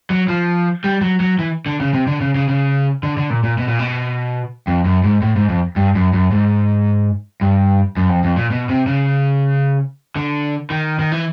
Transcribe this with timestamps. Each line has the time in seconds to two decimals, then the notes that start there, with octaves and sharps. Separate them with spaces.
0.10 F#3
0.28 F3
0.84 G3
1.01 F#3
1.20 F#3
1.39 E3
1.66 D3
1.80 C#3
1.93 C3
2.07 D3
2.21 C#3
2.35 C#3
2.48 C#3
3.03 D3
3.17 D3
3.30 A#2
3.43 A#2
3.58 B2
3.68 A#2
3.79 B2
4.67 F2
4.85 F#2
5.04 G#2
5.22 A2
5.36 G#2
5.49 F2
5.76 G2
5.95 F#2
6.13 F#2
6.31 G#2
7.41 G2
7.97 F#2
8.09 F2
8.24 F2
8.37 A#2
8.51 B2
8.69 C3
8.87 C#3
10.16 D3
10.70 D#3
10.99 D#3
11.12 E3